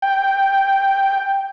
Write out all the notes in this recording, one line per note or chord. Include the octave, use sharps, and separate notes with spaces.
G5